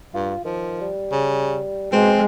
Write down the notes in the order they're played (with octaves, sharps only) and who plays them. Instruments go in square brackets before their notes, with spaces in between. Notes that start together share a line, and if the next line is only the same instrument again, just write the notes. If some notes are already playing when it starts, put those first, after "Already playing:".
[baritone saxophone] G2 [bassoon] F4
[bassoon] D#3 [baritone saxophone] F3
[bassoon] G3
[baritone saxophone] C#3
[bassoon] B2 [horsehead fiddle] G#3 [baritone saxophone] C4